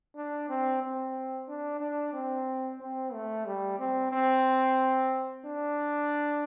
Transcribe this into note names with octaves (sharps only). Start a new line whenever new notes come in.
D4
C4
C4
D4
D4
C4
C4
A3
G3
C4
C4
D4